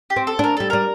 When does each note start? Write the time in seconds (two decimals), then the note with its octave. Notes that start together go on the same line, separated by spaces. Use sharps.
0.10 G4
0.16 C4
0.27 A4
0.39 D4 A#4
0.57 G3 A4
0.70 G3 A#4